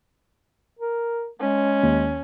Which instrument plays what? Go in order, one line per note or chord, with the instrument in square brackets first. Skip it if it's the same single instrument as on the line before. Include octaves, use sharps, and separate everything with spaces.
[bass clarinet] A#4
[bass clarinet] G#3 [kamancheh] C#4
[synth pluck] D#2